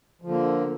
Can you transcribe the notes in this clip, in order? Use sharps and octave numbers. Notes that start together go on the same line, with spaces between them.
D3 F3 A#3